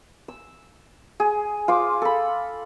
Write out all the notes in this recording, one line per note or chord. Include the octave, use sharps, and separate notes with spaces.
E6
G#4
F4 C5 D6
A4 B5